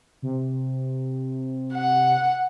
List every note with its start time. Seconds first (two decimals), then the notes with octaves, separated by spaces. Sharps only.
0.22 C3
1.73 F#5